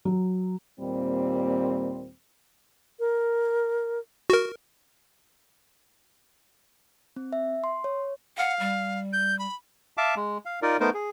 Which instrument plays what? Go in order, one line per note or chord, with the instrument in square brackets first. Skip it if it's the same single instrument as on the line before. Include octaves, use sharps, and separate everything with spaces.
[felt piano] F#3
[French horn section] D#2 A#2 G3 C4
[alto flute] A#4
[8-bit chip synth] F#4 A#4
[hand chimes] C4
E5
C6
C#5
[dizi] F5 [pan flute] F#5
[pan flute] G3
[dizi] G6
B5
[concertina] E5 F5 A5 D6
G#3
F5
D#4 F4 A#4 D5
A3 B3 D#4 A#4 C5
G#4